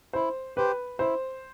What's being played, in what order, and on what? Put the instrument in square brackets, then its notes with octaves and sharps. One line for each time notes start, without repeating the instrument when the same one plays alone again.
[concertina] E4 [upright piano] C5
[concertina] G4 C5 [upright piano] B4
[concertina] E4 [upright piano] C5